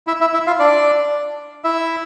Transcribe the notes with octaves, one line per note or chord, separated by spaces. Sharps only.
E4 E5
E4 E5
E4 E5
F4 F5
D4 D5
E4 E5